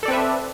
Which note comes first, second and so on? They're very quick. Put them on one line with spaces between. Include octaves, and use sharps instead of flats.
A4 D5 C4 B4 E5